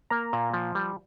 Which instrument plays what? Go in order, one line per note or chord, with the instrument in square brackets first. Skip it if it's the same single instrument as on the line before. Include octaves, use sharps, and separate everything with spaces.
[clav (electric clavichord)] A#3 [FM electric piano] A#5
[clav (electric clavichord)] A#2
F3
G3